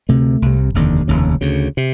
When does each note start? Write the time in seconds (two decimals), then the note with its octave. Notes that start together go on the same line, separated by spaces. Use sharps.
0.09 D2 C3 A3
0.42 C2 C3
0.74 F1 D#2 D3
1.08 F1 D#2 C#3
1.41 D2 C#3
1.77 C3